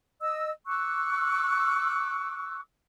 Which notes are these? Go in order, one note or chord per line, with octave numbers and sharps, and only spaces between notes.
D#5 E6
C#6 D6 E6 F#6